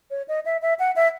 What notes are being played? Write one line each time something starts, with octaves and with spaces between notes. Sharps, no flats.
C#5
D#5
E5
E5
F#5
E5